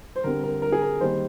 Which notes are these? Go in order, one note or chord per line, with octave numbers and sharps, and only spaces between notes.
C5
D3 G3 C4 A#4
A#4
A#4
G#4
A#4
D#3 G3 A#3 C5